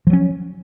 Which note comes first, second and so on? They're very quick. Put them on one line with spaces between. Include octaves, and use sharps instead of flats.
F3 F#3 C#4